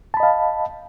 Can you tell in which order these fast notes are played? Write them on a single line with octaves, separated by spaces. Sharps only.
A5 B5 D#5 F5